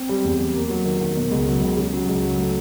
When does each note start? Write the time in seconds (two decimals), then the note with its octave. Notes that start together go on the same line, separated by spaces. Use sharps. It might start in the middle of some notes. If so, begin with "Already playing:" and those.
Already playing: C4
0.09 G3
0.24 E2
0.39 G3
0.54 A#3
0.69 F#3
0.85 D#3
1.01 D#3
1.16 B2
1.31 C#2
1.46 F#3
1.62 C#2
1.77 C#3
1.93 F#3
2.07 C#2
2.23 F#3
2.39 A3